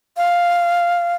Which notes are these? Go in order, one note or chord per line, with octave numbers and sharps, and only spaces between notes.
F5